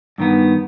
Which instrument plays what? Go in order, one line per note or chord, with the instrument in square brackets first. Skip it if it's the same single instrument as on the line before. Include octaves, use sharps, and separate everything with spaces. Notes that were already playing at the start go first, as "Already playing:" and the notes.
[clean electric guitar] G2 D#3 B3